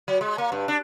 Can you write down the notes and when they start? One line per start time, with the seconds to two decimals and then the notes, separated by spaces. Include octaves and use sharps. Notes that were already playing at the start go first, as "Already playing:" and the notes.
0.08 F#3
0.21 G#3
0.38 A#3
0.52 G2
0.68 D4